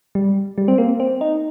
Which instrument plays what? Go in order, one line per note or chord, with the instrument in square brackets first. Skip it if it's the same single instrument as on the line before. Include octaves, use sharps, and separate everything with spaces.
[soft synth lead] G3
G3
C4
A#3
C4
D#4